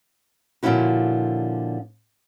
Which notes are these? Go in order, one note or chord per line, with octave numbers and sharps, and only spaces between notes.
A#2 D3 F3 C#4 E4 F#4